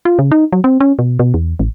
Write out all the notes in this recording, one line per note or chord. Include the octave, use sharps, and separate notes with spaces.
F4
C#3
D#4
F#3
C4
C#4
B2
B2
E2
A1